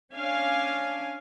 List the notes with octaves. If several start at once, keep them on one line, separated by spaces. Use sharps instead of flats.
C#4 D4 F5 G#5